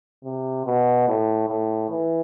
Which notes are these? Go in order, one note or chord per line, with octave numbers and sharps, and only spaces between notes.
C3
B2
A2
A2
E3